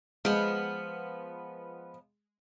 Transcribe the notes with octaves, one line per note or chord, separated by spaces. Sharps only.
F3 G#3 B3